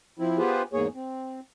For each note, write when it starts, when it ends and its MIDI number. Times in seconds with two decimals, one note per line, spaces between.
0.19 0.38 53
0.19 0.38 60
0.19 0.38 64
0.38 0.62 59
0.38 0.62 65
0.38 0.62 67
0.38 0.62 68
0.38 0.62 71
0.38 0.62 72
0.73 0.87 40
0.73 0.87 44
0.73 0.87 58
0.73 0.87 68
0.73 0.87 73
0.95 1.40 60